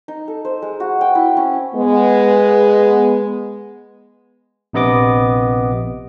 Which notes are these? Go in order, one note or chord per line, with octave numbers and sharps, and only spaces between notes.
D#4
A4
C5
G#3
F#4
G5
E4
C#4
G#3 B3
A#1 C3 B3 D#5 D6